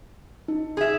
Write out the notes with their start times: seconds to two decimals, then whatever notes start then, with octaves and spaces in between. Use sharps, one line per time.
0.48 D#4
0.77 G#4 E5